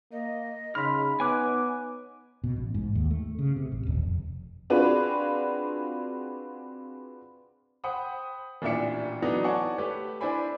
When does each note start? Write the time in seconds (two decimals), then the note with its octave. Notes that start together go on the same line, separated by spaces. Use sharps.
0.12 A#3 D#5
0.75 C#3 D#4 B5 C6 F6 B6
1.20 B3 C#5 G#5 D6 F#6
2.44 B2
2.56 A1
2.74 G#2
2.95 D#2
3.11 A3
3.39 C#3
3.56 C3
3.72 A1
3.87 D#1
4.03 F1
4.70 C4 D4 F4 F#4 G#4 B4
7.84 C5 F#5 G5 B5 D#6
8.62 A1 A#2 D4 E4 E5 C#7
9.22 E3 F#3 A3 B3 D4 D#4
9.44 C#5 D5 F#5 G#5 A5 C#6
9.78 A3 G4 B4
10.21 D4 E4 C5 D5 G#5 B5